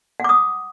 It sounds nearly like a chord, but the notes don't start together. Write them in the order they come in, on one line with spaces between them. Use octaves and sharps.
F#5 D6 D#6